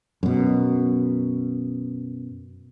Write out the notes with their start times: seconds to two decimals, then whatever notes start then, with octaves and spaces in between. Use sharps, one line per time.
0.23 F#2 B2